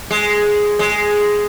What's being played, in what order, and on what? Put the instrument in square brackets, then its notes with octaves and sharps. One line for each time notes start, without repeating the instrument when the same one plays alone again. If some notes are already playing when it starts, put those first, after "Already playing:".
[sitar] G#3
G#3